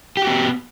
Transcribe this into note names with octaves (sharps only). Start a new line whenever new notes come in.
B3 F#4 G4